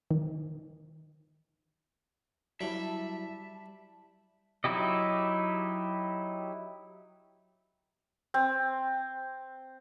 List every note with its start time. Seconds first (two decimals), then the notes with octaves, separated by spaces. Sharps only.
0.11 D#3
2.61 F#3 G3 E4 E5 A5
4.64 F#3 D#4 E4 G4 D#5
8.34 C4